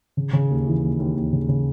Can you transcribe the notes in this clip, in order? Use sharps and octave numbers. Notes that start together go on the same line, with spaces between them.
C#3
C#3
D#2
E3
D#2
D#2
D#2
C#3
C#3